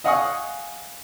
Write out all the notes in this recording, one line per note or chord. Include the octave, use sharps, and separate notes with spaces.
D#5 F5 F#5 G#5 C#6 D#6